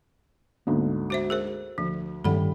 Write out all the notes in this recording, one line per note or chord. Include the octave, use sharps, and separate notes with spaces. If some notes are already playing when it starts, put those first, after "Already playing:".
D2 G#2 D3 A#3 B3
F#4 C5 E5
G#4 A#4 C5
D2 F3
A1 G2 D#3 G3 A4 F#5 B5